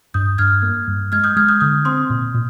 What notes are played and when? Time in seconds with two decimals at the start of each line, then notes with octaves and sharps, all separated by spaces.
0.14 G2 D#6 G6
0.38 G2 F6 G#6
0.62 A#3
0.87 G2
1.12 G#3 F6 G#6
1.24 D#6 G6
1.37 G#3 F6 G#6
1.49 D#6 G6
1.60 D3 D#6 G6
1.85 C4 C6 D#6
2.10 A#2
2.34 A#2